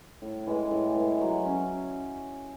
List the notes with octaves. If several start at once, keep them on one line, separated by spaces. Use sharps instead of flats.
A2
E3 G#3
A2
E3 G#3
F#3
C#4